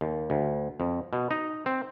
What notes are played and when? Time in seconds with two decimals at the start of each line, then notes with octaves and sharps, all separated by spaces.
0.01 D#2
0.30 D2
0.80 F2
1.13 B2
1.31 D#4
1.66 C4